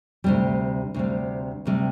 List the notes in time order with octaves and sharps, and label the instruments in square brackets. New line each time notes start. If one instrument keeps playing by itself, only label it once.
[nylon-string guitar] D2 C3 G3
D2 C3 G3
D2 C3 G3